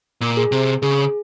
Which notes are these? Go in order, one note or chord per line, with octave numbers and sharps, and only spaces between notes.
A#2
G#4
C3
C#3 G#4